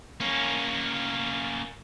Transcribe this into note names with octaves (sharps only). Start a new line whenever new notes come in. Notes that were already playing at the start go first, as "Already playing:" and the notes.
A#3 C#4